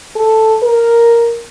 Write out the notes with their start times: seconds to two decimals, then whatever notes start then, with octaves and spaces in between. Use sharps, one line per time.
0.16 A4
0.63 A#4